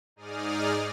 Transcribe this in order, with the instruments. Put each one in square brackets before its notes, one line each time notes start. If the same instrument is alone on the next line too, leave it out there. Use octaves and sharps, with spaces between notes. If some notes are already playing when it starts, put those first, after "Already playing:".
[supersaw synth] G#2 D#4 G#4 D5 D#6 F6